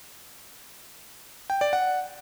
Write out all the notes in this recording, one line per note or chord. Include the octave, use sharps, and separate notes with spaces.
G5
D5
F#5